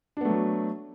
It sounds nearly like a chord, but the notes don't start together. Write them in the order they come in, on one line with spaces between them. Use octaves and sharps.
D4 B3 A3 F#3